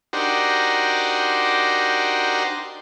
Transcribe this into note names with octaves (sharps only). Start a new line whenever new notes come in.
D4 D#4 F#4 G4 A#4 C5